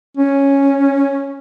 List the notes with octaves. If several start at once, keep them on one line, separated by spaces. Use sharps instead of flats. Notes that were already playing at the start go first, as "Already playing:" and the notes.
C#4